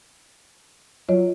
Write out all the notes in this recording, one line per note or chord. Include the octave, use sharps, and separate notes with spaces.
F#3 F4 C#5 D#5